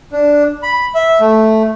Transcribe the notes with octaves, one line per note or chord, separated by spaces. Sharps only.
D4
B5
E5
A3